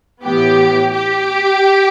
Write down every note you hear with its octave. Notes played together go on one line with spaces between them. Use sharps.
A2 E3 B3 G4
G4